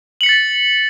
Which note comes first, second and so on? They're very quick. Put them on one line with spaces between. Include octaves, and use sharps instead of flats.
F#7 C#7 B6 A6